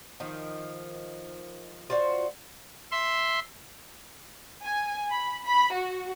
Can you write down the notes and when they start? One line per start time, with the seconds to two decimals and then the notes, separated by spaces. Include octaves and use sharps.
0.20 D#3 F3
1.90 F4 F#4 C5 D5
2.92 E5 C6
4.62 G#5
5.11 B5
5.44 B5
5.73 F#4